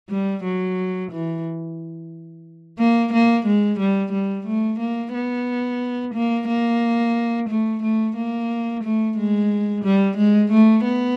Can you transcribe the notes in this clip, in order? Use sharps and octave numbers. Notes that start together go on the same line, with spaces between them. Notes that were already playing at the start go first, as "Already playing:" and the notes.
G3
F#3
E3
A#3
A#3
G#3
G3
G3
A3
A#3
B3
A#3
A#3
A3
A3
A#3
A3
G#3
G3
G#3
A3
B3